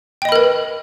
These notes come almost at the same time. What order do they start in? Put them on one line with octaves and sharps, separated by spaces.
G5 D#5 B5 A#4 B4